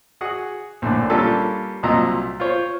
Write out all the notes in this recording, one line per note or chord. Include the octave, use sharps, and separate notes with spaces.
F#4 G#4 F#5
A#1 A2 D3 D4
G3 A#3 C#4 D4 F4 A4
C2 A#2 F#3 D#5 A#5 E6
F4 C5 C#5